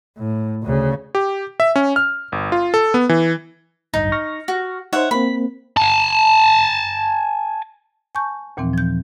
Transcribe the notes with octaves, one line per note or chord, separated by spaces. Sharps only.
A2
D2 C#3
G4
E5
C#4
F6
G1
F4
A4
B3
E3
A1 D2 G2 D#4
C#6 F6 A#6
F#4
D#4 C5 C#5 E5 F#5
A#3 C4 B5
G#5 A5
G#5 A5 C#6 G6
D#2 A#2 E3 F3 C4
F3 G6